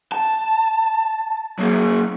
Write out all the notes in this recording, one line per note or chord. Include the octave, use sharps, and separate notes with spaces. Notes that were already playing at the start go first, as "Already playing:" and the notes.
A5
F#3 A#3